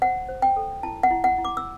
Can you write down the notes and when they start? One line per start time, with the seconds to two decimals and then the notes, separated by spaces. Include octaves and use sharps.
0.02 C5 F#5
0.28 C5
0.42 G5
0.56 A4
0.83 E4 A5
1.03 F#5
1.11 E4
1.24 F#5
1.38 E4
1.45 D6
1.57 E6